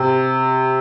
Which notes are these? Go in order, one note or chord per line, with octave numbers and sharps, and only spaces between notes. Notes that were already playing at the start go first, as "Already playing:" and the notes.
Already playing: C3